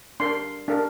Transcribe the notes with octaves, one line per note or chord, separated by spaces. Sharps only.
D4 A#4 C6
D4 A#4